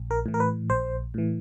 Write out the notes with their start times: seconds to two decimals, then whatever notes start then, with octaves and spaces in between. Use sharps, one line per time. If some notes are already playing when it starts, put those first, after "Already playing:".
Already playing: A#1
0.11 A#4
0.26 A2 E3
0.34 A#4
0.40 B4
0.70 A#1 C5
1.14 A2 E3